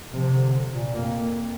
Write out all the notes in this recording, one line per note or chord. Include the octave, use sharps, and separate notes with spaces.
C3 F3
D3
C3
A#2
F2 A#3